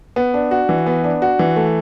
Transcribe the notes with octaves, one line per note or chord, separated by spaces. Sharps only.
B3
D4
F#4
E3
B3
D4
F#4
E3
A3